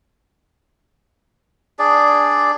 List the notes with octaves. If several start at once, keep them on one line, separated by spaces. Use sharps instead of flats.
D4 G#4 D5